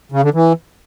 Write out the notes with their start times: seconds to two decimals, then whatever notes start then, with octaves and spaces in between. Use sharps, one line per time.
0.12 C#3
0.23 D3
0.34 E3